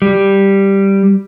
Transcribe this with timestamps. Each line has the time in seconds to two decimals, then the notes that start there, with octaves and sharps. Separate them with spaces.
0.02 G3